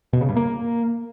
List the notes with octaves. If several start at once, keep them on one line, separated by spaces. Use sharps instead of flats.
B2
C#3
G2
A#3